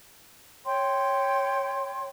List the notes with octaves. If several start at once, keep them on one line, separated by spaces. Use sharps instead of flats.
C#5 G5 C6